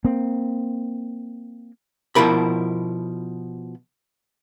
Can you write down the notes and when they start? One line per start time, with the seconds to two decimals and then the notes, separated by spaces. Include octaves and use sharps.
0.05 A#3 C4
2.15 B2 F3 E4 A#4 B5